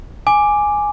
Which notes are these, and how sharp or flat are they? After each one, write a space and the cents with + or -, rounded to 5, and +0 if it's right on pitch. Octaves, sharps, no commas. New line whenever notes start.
G#5 +0 D6 +5